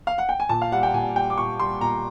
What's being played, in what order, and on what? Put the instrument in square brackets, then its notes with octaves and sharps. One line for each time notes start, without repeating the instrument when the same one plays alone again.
[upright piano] F5
F#5
G5
G#5
A#2 A5
F5
G3 F#5
G5
A#2 G#5
G3 G5
D6
A#2 C#6
G3 C6
A#2 A#5